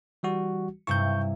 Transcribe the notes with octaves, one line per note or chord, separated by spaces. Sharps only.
E3 G3 F#4
G2 C3 E4 C#6 G6